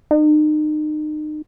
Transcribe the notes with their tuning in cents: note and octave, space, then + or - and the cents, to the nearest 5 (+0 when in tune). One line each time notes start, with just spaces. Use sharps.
D#4 -35